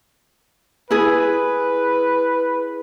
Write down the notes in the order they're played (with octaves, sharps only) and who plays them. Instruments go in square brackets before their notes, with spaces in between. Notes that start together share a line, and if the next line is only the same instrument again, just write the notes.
[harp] E4 G#4 [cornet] B4